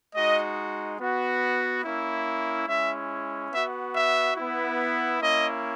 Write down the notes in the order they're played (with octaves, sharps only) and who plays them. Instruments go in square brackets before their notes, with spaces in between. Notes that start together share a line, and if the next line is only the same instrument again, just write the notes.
[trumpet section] G#3 D#4 F#4 D#5
B3 F#4
A#3 C#4 E4
G#3 C#4 E4 E5
B3 F#4 E5
E5
B3 E4
A#3 C#4 E4 D#5